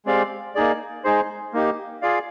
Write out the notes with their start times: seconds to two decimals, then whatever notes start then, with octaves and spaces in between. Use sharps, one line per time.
0.06 G#3 C4 G4 D5 F5
0.55 A#3 D#4 G#4 D5
1.04 G#3 D#4 G#4 C5
1.53 A#3 D#4 G4
2.02 F4 G#4 D5 F5